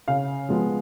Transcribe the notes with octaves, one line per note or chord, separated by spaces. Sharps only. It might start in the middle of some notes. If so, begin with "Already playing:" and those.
C#3 F5
F3 G#3 B3